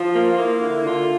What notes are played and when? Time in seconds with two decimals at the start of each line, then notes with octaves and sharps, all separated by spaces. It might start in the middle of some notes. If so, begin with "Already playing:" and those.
Already playing: F3 F4
0.14 A#3
0.37 A#3 E4
0.61 D3
0.74 E4
0.84 D3 F4